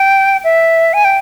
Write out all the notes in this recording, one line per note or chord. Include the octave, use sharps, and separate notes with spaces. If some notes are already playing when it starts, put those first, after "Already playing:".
Already playing: G5
E5
G#5
G5